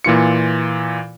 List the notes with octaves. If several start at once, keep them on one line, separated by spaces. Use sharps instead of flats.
A#2 E3 F4 C#7